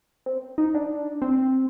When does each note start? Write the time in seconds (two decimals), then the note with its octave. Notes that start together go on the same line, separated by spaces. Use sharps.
0.26 C4
0.58 D#4
0.75 D4
1.22 C4